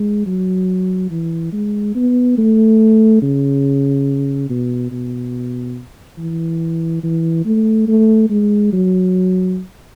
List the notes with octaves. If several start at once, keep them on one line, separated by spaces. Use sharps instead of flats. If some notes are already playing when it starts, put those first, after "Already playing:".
Already playing: G#3
F#3
E3
G#3
B3
A3
C#3
B2
B2
E3
E3
A3
A3
G#3
F#3